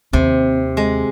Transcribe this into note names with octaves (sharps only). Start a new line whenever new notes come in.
D#2 C3 C4
G#3